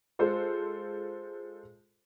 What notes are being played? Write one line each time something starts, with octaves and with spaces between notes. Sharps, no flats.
G#3 F4 A4 C5